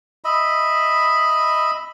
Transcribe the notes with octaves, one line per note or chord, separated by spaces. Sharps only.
D#5 E5 B5